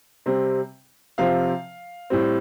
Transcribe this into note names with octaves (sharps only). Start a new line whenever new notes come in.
C3 G3 C4
C3 F3 C4 F5
A2 G3 C4